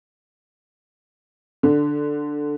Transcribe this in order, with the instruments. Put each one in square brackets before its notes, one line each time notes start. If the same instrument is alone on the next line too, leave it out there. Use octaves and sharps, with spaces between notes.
[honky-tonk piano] D3